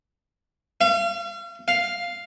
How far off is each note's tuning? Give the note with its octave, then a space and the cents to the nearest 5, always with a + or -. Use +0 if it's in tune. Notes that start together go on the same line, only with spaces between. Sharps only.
F5 -40
F5 +0